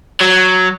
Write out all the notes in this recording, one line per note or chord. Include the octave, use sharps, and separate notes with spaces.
F#3